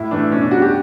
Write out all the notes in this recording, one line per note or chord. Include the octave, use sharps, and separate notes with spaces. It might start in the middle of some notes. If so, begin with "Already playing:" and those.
Already playing: A2 E4
E3 A3 D4
B2 C#4
D4
G3 F#4
G4